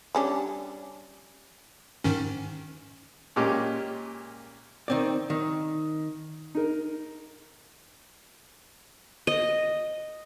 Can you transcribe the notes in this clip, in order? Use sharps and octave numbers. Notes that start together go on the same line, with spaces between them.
G3 C#4 D4
G#2 D#3 C#4
A#2 G#3 C#4 G4
D#3 C4 D5
D#3
D#4 A#4
D#5